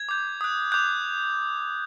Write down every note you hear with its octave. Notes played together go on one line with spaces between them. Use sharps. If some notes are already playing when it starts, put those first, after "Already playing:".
Already playing: G#6
D6 G6
D#6 F#6
D6 F#6 G6